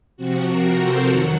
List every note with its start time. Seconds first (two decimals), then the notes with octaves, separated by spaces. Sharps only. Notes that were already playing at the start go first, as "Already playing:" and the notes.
0.17 C3 F3 C4 F#4
0.48 F#4 A#4
0.78 A4 C5
1.08 F2 D#3 F#3 F#4